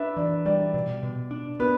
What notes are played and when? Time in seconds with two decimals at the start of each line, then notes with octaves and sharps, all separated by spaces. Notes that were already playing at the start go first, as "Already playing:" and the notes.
Already playing: D4 B4 E5
0.17 E3 D5
0.45 G3 D5
0.74 B2
1.03 B2
1.31 D4
1.59 B3 B4